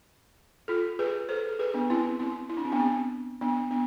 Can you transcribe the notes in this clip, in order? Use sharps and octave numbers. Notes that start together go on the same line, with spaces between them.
F4 A4
G#4 B4
A4 C5
A4
G#4 B4
B3 D4
C4 E4
C4 E4
E4
D4
C4
B3 D4
C4
B3 D4
B3 D4